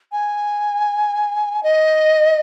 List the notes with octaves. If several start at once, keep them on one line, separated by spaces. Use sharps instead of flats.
G#5
D#5